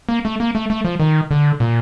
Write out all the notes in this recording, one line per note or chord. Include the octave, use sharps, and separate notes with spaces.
A#3
A3
A#3
A3
A3
F3
D#3
D3
A#2